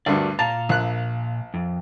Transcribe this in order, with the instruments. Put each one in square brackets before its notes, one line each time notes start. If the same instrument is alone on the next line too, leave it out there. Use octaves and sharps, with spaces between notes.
[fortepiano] D2 G2 [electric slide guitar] F#4 A#4 D5
[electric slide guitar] A#2 F5 A#5 [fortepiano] A5
[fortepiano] A#1 F#6
[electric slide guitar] F2